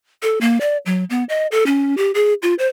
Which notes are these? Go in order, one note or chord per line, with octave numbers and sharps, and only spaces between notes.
A4
A#3
D5
F#3
B3
D#5
A4
C#4
G4
G#4
F4
C5